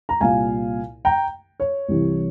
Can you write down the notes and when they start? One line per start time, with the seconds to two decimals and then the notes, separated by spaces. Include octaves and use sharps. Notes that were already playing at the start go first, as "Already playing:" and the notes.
0.09 A#5
0.20 C2 A#2 F5 G#5
1.05 G5 A#5
1.60 C#5
1.88 C2 C3 E3